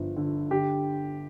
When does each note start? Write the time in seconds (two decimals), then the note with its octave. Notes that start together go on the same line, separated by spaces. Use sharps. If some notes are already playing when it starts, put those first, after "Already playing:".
Already playing: G1 F3
0.16 D3
0.51 D3 G4